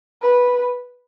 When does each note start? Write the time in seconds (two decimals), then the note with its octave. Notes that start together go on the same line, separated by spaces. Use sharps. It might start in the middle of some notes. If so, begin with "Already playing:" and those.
0.22 B4